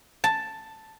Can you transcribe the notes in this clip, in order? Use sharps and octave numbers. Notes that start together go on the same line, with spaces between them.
A5